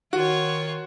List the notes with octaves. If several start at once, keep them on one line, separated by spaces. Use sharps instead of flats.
D#3 F4 F#4 C#5